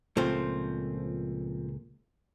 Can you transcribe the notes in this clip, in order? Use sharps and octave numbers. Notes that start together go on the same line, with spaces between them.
C#2 A#2 F3 A3 C4